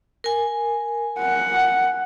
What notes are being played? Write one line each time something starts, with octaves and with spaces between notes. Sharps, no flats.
A#4 G#5
F#5